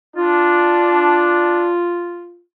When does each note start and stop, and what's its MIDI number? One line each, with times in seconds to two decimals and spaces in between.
0.16 1.72 62
0.16 2.41 65